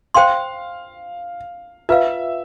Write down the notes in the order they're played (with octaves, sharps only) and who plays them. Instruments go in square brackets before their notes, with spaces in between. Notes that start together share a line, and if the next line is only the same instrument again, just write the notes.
[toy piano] C5 G5 C6 [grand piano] F5
[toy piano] F4 B4 F5 [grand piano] E5